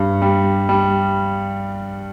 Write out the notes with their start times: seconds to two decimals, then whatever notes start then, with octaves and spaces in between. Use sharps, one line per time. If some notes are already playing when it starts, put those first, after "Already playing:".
Already playing: G2
0.22 G3
0.69 G3